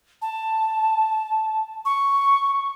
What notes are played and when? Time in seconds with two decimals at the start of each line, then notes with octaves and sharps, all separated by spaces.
0.22 A5
1.85 C#6